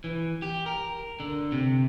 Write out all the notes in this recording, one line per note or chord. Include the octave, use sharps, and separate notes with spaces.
E3
G4
A#4
D3
C3